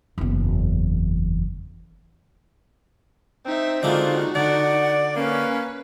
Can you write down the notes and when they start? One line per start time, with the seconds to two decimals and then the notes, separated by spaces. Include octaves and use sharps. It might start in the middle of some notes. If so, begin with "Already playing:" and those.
0.18 F#1 E2
3.46 C4 D#4 E5
3.83 D3 G#3 A#3 D#4 F4 F#4
4.35 D3 D5 F#5
5.16 A#3 C#4 B4